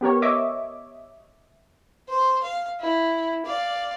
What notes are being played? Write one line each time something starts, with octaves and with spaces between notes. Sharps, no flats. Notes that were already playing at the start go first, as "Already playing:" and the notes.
B3 G4 A#4 C#5
C#5 D#5 E5 D6
C5
F5
E4
D5 F5